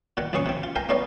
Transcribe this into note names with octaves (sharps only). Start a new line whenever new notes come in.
A#2 D#3 F#5
A#1 F2 C#3 G#4 C#6 D#6
C3 C4
F4
A#4 F5 G5 G#5 A#5
A3 B3 D#4 C#5 D5 F5